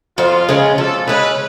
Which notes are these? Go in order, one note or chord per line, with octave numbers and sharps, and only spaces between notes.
F2 F4
C#3 G#3 C#4
F2 A4
C#3 G#3 C#4 B4